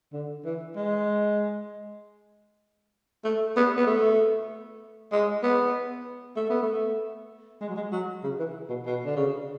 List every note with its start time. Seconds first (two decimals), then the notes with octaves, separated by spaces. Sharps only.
0.13 D3
0.45 E3
0.76 G#3
3.24 A3
3.56 B3
3.77 B3
3.87 A3
5.12 G#3
5.43 B3
6.36 A3
6.50 B3
6.63 A3
7.61 G#3
7.68 F#3
7.76 G#3
7.92 F#3
8.23 C#3
8.39 E3
8.69 B2
8.86 B2
9.06 D3
9.16 C#3